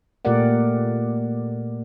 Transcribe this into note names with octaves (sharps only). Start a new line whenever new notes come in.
A#2 A3 G4 A#4 D5 F#5